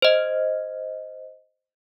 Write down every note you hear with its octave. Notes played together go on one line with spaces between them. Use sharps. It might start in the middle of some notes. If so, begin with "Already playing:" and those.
C5 D#5